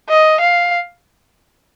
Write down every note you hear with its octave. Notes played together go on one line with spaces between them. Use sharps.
D#5
F5